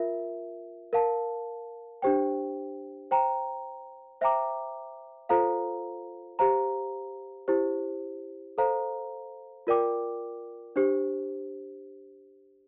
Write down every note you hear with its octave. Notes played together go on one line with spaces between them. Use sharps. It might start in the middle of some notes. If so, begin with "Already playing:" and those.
Already playing: F4 A#4 E5
A#4 F5 A5
D4 G4 C5 G5
C5 G5 A#5
C5 E5 G5 A#5 D6
F4 A4 C5 F5 A#5
G4 C5 F5 A#5
E4 G4 C5
A4 C5 F5 A#5
F4 A#4 D5 G5 D6
D4 G4 C5